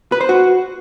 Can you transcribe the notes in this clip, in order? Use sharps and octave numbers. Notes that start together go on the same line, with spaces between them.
B4
C5
F#4